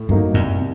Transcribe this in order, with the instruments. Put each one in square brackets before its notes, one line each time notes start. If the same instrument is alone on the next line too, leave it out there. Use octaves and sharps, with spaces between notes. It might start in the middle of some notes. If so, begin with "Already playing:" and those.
Already playing: [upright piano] A2
[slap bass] G2 [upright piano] F#3 A#3 D#4
[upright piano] C2 [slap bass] F#2
[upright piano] C3